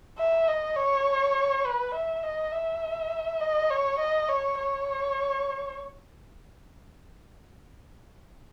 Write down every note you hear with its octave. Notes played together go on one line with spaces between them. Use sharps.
E5
D#5
C#5
B4
E5
D#5
E5
D#5
C#5
D#5
C#5
C#5